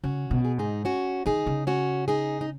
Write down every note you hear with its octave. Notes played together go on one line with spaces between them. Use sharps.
C#3 C#4 F#4
B2
G#4
G#2 D#4 G#4
C#4 F#4
D#3 D#4 G#4
C#3
C#4 F#4
D#4 G#4
D#4